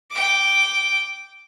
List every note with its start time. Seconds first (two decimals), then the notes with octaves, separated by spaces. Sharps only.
0.11 G5 D6